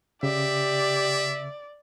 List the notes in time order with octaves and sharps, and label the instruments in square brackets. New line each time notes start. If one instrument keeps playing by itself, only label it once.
[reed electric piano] C#3 [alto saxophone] G4 [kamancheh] D5 [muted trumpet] E5